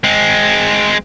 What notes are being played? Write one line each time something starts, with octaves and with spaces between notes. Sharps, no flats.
G#3 C4